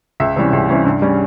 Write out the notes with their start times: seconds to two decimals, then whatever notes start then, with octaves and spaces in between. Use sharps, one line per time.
0.20 C#2 E5
0.36 C3 E3 G3 C#4
0.53 C#2
0.69 C3 E3 G3 C#4
0.85 G2
1.02 G3 C#4